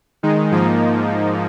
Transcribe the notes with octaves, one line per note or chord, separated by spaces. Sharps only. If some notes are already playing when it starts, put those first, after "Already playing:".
D#3 G#3 D#4
G#2 F3 A#3 D#4